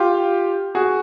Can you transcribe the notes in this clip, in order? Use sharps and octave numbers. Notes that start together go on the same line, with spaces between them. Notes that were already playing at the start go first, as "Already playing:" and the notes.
Already playing: F4 G4
F#4 G#4